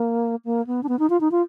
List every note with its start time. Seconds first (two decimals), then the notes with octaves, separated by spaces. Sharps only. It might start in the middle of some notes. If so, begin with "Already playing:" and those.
Already playing: A#3
0.45 A#3
0.67 B3
0.83 D4
0.89 B3
0.99 D#4
1.10 F4
1.21 D#4
1.32 F4